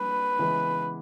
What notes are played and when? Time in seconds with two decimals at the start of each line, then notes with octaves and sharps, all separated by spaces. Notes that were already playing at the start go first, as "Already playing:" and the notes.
Already playing: G3 A#3 D4 B4
0.39 C#3 E3 G#3 B3